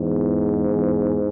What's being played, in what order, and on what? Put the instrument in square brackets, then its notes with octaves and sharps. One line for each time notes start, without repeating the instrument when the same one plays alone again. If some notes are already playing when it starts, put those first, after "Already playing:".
Already playing: [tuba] E2 [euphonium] G#2
[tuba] E2